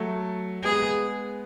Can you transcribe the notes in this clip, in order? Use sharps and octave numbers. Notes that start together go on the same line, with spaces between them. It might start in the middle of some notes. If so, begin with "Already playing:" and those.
Already playing: F#3 A3
G#3 B3 G#4